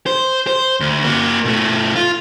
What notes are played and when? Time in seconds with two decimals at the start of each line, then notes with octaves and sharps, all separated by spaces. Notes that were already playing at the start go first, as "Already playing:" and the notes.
0.06 C5
0.47 C5
0.80 D2
1.04 A#3 F#4
1.45 B2 A3
1.96 F4